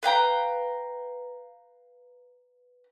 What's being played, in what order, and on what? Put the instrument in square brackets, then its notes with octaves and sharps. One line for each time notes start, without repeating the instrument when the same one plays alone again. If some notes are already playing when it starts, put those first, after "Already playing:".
[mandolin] B4 F5 G5 A#5